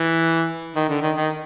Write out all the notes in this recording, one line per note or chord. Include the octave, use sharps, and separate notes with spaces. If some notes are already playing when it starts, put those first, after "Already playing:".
Already playing: E3
D#3
D3
D#3
D#3